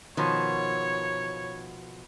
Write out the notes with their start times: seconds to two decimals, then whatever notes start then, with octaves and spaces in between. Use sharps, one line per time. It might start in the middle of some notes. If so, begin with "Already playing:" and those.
0.17 B2 D#3 F3 C#5